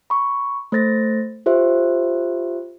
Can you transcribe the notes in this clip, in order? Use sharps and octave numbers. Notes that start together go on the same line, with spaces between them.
B5 C#6
A3 C5 A6 A#6
F4 G4 C5 E5